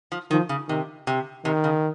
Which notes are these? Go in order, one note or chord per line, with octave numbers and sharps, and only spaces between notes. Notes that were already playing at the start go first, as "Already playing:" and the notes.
F3
D#3 F3
C#3
C3 D#3
C3
C3 D#3
C#3